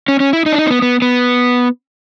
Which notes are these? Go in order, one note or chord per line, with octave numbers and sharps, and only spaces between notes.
C#4
C#4
E4
D#4
D4
D#4
C4
B3
B3
B3